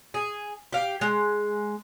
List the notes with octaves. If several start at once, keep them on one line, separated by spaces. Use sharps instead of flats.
G#4
G4 F5
G#3